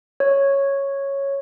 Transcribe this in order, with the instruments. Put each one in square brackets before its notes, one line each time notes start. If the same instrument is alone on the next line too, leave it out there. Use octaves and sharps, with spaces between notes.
[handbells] C#5